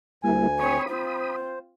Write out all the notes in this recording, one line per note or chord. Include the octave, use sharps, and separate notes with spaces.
D2 G3 A#3 E4 G#5
C4 C#5 B5 D#6
C4 F4 C5